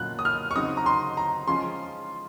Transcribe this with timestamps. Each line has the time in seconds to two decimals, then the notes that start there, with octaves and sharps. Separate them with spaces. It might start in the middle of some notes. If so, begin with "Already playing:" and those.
Already playing: A#2 F#3 C#4 F4 F#6
0.19 D#6
0.25 F6
0.51 C#6
0.55 C#3 F#3 C4 D#4 D#6
0.77 A#5
0.86 C6
1.17 A#5
1.48 F3 G#3 C#4 F4 C6